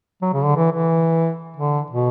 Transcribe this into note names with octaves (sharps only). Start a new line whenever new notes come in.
F#3
C#3
D3
E3
E3
D3
B2